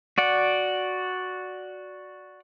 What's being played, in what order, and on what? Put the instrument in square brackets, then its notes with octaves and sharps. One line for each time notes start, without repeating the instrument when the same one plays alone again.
[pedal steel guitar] F#4 D5 F#5